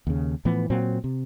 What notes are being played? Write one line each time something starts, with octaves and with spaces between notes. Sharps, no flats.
D#2 C#3
A2 E3 F3 B3
A#2 F#3 C4
C3